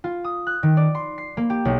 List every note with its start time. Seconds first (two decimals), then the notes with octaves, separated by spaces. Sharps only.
0.04 F4
0.24 D#6
0.47 F#6
0.63 D#3
0.77 D5
0.95 C6
1.18 C7
1.37 A#3
1.50 G4
1.65 B1